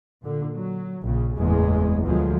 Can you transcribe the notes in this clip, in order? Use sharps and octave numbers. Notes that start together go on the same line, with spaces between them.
A#2 D3
F#3
A#1 C#3
F#1 E2 A2 C#3 G#3
D2 B2 D3 F3 F#3 G#3